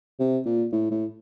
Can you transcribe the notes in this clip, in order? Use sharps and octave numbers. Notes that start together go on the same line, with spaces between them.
C3
A#2
A2
A2